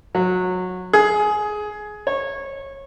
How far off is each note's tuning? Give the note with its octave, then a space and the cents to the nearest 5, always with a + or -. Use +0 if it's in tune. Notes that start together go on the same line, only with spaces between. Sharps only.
F#3 -20
G#4 +15
C#5 -20